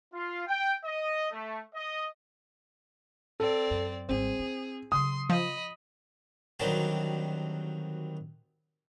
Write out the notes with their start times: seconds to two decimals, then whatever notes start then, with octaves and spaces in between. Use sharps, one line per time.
0.14 F4
0.47 G5
0.84 D#5
1.32 A3
1.75 D#5
3.40 C4 A4 D5
3.70 F#2
4.09 G#1 G3 C4 G#4
4.39 E4
4.92 C#3 F#3 C6 D#6
5.30 F3 D#5 B5
6.60 D2 D#3 F#3 G3 C4 A5